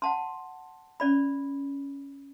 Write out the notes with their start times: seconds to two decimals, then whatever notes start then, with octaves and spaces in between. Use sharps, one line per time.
0.02 F#5 A5 C6
1.00 C#4 D5 B5